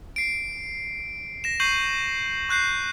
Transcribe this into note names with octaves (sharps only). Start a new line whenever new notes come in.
C7 D7
A#6 E7
C#6 G6 C7 D#7 F#7
C#6 F#6 G6 C7